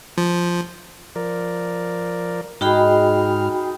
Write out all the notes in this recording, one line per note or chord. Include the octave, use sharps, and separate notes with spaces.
F3
F3 A#4 D5
G#2 D#4 F#4 G#4 G5 B5 F6